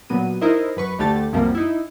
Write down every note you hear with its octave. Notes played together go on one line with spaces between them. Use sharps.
A#2 F#3 B3 D#7
D#4 E4 A#4 C5 D#5
F#2 B4 C#6
D2 D3 A3 G4 A6
C2 F#2 C3 F3 G3 A#3
D#4 E4